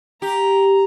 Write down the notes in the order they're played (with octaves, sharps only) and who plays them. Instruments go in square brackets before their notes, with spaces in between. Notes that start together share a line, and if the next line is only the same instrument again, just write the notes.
[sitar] G4 [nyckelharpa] A#5